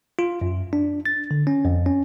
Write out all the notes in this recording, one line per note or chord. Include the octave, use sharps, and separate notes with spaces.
F4
F#2
D4
A6
D3
C#4
F2
C#4